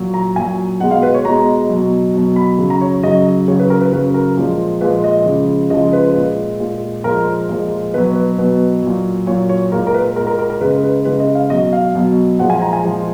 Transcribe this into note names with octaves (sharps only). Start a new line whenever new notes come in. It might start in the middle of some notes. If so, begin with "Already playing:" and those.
Already playing: A#2 F#3
A#5
A#2 F#3 G#5
B2 G#3 F#5
F5
B4
C#5
B2 G#3 A#5
B2 F#3
B2 F#3
B5
C#3 F#3
A#5
C#5
C#3 F#3 D#5
C#3 F#3 C#5
B4
A#4
B4
C#3 F#3 B4
A#4
A#2 F3 G#3
A#2 F3 G#3 B4
D#5
C#3 F3 G#3
C#3 F3 G#3 D#5
B4
A#2 G#3
A#2 G#3
A#2 F3 G#3 A#4
A#2 F3 G#3
B2 F#3 B4
B4
B2 F#3 B4
A#2 F#3
A#2 F#3 C#5
C#5
A#2 G#3 A#4
A#4
B4
A#2 G#3 A#4
A#4
A#4
A#4
C#3 G#3 B4
B4
C#3 G#3 B4
D#5
F5
B2 F#3 D#5
F5
B2 F#3
A#2 F3 G#3 F#5
G#5
A#5
G#5
A#2 F3 G#3